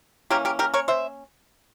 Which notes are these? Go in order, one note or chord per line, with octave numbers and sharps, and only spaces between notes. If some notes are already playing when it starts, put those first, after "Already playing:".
E3 A#3 C#4 G4 A#4
G4 A#4
G4 A#4
A#4 C#5
C5 E5